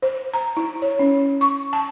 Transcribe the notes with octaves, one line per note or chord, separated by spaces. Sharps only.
C5
A#5
E4
C#5
C#4
C#6
A5